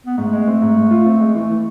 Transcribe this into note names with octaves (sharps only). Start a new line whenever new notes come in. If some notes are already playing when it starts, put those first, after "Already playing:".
B3
G#2 A3
G#3
C4
G#2
G#2
F4
C4
G#3
E3 A3
E3